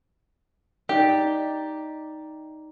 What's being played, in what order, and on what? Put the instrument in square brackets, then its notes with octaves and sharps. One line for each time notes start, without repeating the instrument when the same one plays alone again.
[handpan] D#4 D5 [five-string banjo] G4